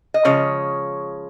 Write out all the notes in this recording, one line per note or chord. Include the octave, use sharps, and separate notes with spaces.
D#5
C#3 F3 G#3 C#5